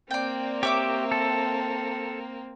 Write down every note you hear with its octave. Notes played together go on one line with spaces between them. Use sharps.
A#3 C4 D5 G5
G4 C#5 E5 D6
A4